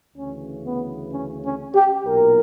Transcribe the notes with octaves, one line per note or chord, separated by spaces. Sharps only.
D2 C#3 E3 C#4
B3
C#4
C#4
G4
B1 A#2 A#4